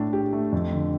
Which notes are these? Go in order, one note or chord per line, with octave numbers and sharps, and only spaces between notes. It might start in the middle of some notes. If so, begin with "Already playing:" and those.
Already playing: A2 A3 D4
G4
A3
F2
D3